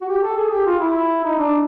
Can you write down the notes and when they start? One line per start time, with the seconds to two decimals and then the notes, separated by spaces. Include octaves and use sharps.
0.01 F#4
0.08 G4
0.23 A4
0.37 G#4
0.51 G4
0.66 F4
0.80 E4
1.24 D#4
1.38 D4